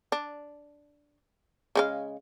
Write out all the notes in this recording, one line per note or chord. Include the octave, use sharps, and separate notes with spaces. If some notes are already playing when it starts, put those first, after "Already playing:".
D4
C#3 G#3 F5